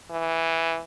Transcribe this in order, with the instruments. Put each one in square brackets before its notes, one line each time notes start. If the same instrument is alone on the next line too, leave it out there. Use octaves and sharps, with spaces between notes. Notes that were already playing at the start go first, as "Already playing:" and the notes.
[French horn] E3